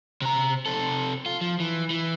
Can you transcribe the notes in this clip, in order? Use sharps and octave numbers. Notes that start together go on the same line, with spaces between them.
C3 A#5
C3 A4
F4
F3
E3
E3